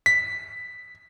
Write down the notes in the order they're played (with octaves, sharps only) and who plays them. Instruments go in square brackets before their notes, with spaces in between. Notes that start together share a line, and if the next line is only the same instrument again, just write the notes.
[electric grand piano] B6